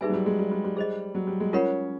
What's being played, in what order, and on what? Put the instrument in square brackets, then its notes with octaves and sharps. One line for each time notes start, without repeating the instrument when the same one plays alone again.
[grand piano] G3 [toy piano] D#4 G#4 B4 E5 G#5
[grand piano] F#3
G3
G#3
G3
G3
G3
[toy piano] G#4 C5 D#5
[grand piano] F#3
G3
G#3
[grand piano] C#4 [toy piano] F4 A#4 C#5 F#5 B5